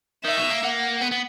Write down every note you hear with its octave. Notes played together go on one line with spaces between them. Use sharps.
D#3 E5
B2
A#3
A#3 F#5
B3
B3